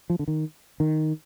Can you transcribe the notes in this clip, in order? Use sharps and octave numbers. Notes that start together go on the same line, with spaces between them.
F3
D3
D#3
D#3